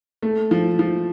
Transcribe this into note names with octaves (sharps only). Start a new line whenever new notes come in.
A3
F3
F3